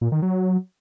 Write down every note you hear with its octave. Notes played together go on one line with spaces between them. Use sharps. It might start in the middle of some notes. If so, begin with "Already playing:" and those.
A#2
D#3
F#3